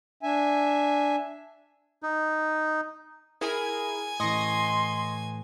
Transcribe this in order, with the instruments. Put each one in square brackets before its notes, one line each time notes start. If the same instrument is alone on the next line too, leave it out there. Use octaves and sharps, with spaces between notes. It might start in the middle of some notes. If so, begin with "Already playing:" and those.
[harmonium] D4 E5 G#5
[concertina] D#4
[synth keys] E4 G#4 A#4 [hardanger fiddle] G#5
[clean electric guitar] A2 E3 [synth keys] D#5 C#6 A#6 [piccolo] C6